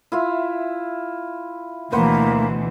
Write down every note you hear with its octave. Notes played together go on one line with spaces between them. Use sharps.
E4 F4 E5
D2 B2 E3 A#3 B4 C5 F#5